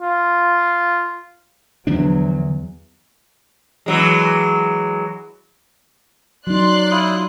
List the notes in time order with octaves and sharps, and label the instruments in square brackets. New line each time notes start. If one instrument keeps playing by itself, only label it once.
[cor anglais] F4
[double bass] E2 F#3 [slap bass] D3 F3 D4
[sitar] E3 F#3 G#3
[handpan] F#3 D#4 [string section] D5 C6 F#6
[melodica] E4 F4 D#6